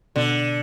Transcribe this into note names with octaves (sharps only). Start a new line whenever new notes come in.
B2 D3